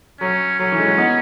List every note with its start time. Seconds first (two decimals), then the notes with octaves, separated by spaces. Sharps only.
0.21 F#3 C#4
0.59 F#3 C#4
0.72 E3
0.79 G#3
0.85 F#3
0.98 B3 D#4